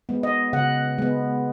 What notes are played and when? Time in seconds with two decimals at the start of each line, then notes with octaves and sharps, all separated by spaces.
0.09 G#3 B3
0.23 D#5
0.53 C#3 F#5
0.98 G#3 B3